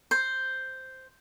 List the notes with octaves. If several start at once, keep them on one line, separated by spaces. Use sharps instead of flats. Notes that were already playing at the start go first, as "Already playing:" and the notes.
C5